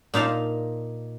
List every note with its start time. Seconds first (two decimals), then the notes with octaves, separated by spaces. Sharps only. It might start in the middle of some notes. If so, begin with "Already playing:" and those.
0.14 A#2 D#4 F5 A5